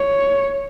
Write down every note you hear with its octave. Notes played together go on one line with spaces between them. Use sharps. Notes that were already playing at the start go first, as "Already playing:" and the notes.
Already playing: C#5